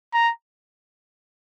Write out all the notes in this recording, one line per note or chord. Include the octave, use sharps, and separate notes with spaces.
A#5